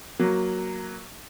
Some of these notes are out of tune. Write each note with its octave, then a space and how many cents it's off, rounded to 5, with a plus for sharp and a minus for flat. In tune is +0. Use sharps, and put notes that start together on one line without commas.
F#3 +0 A#3 +0